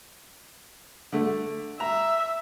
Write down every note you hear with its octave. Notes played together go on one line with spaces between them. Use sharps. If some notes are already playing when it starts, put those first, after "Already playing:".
D3 A3
E5 A#5